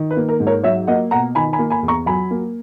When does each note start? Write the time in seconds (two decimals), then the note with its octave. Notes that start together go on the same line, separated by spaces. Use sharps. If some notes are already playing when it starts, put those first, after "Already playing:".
Already playing: D#3
0.11 B4
0.16 A#3
0.29 A#4
0.40 G#2
0.47 A#4 C#5
0.64 F#3 C#5 E5
0.87 A#3 D#5 F#5
1.11 B2 F#5 A#5
1.35 D#3 G#5 B5
1.53 G#5 B5
1.59 A#3
1.70 G#5 B5
1.83 E2
1.88 A#5 C#6
2.06 F#3 G#5 B5
2.31 A#3